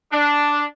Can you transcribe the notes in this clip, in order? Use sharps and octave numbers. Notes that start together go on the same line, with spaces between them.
D4